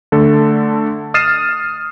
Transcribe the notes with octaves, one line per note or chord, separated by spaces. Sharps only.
D3 A3 A4
D#6 F6 A6 C7 D#7 E7